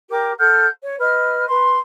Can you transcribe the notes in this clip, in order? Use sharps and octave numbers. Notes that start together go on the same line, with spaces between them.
G4 A#4 D6
A4 F#5 F6 G6
C#5
B4 D#5 F6
B4 C6